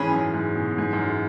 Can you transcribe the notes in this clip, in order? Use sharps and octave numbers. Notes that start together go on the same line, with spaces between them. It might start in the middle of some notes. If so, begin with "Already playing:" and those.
Already playing: G#2 E3 C#4 G#4
F#2
G#2
B2
G#2
F#2
G#3